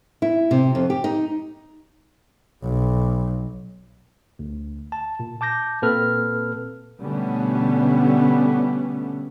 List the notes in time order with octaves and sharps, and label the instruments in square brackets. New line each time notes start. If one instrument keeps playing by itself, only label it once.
[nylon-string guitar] E4
C3
F2
G4
D#4
[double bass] B1
[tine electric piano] D2
A5
A#2
A5 D6 G6 A#6
A#2 A#3 C4 A4 B4 F6
[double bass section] B2 D3 G3 A3 B3 C#4